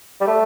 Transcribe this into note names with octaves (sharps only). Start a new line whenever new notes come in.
G3
A3